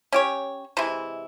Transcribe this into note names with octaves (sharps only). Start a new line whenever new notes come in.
C#4 G4 C#5
C3 E3 G#3 E4